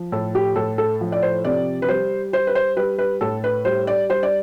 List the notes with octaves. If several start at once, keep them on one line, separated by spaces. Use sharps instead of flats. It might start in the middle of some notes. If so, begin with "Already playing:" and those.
Already playing: F3
A2 A4
G4
A2 A4
A4
F3
D5
C5
C3 D5
B4
G3 C5
G3 C5
B4
C5
G3 B4
B4
A2 A4
B4
G3 C5
D5
G3 C5
D5